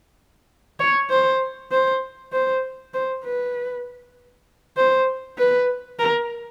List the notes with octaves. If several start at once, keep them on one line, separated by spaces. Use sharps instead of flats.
C#5
C5
C5
C5
C5
B4
C5
B4
A#4